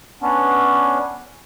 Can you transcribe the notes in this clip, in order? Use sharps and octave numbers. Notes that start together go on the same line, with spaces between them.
B3 C#4 D4